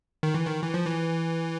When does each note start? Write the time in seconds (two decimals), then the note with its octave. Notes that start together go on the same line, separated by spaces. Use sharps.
0.23 D#3
0.35 E3
0.46 D#3
0.63 E3
0.74 F3
0.86 E3